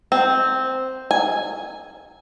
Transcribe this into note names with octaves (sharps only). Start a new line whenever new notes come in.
C4
G#5